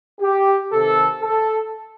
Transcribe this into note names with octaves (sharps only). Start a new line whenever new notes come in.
G4
C3 D#3 A4
A4